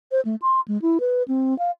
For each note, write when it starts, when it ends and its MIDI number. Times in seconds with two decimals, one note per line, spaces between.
0.12 0.21 72
0.25 0.35 57
0.42 0.60 84
0.68 0.80 56
0.82 0.98 64
1.00 1.23 71
1.28 1.57 60
1.59 1.71 77